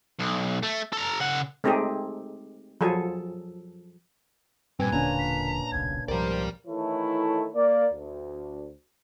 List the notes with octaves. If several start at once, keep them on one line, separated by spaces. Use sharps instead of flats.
B1
A3
A4 A#5
C#3 F#5
G#3 A3 C4 D#4 G4 G#4
F3 F#3 G#4 A4
G2 A#2 C4 B4 G#5
E1 D3 A#3 C#4 D4 A#5
B6
D#1 B1 C#3 G#6
C2 G#2 F3 G4 A#4 C5 D5
D#3 E3 A3 E4 A4 C#5
A#3 D5
D2